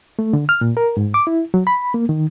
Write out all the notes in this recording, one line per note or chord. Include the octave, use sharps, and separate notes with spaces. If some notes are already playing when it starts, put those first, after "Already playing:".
A3
D3
F6
A#2
A#4
G#2
D6
E4
F#3
B5
A#3
D#3